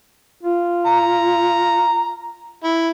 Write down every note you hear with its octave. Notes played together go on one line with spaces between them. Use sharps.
F4
A#5
E4